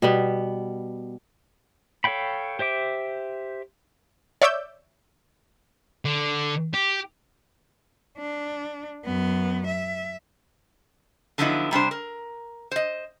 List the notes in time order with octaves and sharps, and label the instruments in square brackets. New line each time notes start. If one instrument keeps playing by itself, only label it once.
[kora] B2 G3 B3
[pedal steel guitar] A4 C#5 F5 G5 B5
G4 C5 E5 D6
[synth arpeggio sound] C#5 D5 E5 D6 E6 G6
[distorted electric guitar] D3
G4
[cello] D4
F#2 B3
E5
[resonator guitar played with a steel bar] D3 F3 F#3 B3 D#4 E4
C3 G3 D4 C5
A#4
C5 D#5